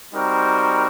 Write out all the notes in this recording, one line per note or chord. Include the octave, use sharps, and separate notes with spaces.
G3 C4 D#4 F#4 A#4